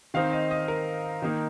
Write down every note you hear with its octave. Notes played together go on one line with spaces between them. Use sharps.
D#3 C4 D#4 F5
D#5
D#5
A#4
D#3 A#3 D#4